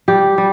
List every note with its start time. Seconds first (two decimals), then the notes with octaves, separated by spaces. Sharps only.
0.08 G3 G4
0.38 G3